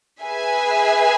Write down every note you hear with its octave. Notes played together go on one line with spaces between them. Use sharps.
G#4 B4 E5 G#5